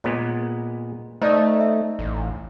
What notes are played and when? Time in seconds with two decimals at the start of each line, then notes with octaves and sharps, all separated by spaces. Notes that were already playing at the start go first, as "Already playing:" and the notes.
0.04 A#2 G#3 B3 C#5
1.22 A3 D#4 C5 D5 D#5
1.61 E5
1.99 A1